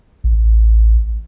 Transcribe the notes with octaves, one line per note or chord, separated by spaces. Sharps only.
A1